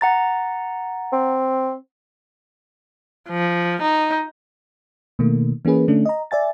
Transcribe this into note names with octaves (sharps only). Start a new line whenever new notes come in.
F#5 A#5 A6
C4
F3
D#4
B2 D#3 A3 A#3
E3 A#3 C#4 G#4 B4
D3 A3 C#4 D4
D#5 A#5
D5 E5 G#5 A6